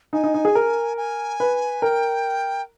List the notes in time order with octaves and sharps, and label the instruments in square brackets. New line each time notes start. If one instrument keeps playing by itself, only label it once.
[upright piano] D#4 [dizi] G#5
[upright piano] D#4
D#4
G#4
A#4
[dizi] G#5
[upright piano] B4
[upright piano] A#4 [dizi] G5